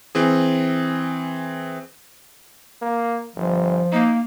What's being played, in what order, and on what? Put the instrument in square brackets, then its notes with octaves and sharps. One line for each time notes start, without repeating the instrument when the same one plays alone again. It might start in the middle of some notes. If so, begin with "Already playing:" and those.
[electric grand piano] E3 C4 G#4
[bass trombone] A#3
[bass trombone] G1 [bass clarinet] F3
[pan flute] A#3 [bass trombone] D#4